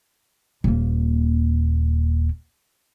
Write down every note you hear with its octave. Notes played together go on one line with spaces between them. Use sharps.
D#1 A#3